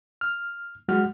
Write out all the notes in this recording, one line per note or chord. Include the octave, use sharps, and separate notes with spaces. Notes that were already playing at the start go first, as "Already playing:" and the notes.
F6
F#3 G#3 F#4 F6